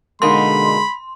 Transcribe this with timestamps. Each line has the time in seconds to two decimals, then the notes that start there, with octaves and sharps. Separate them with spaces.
0.22 B2 D3 G#3 A#3 D#4 B5 C6